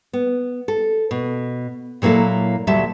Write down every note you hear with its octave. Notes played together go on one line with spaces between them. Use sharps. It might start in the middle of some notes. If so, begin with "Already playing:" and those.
B3
A4
B2
A#2 F#3 A#3 E4 A4
D2 A#2 F#3 G3 E5 A5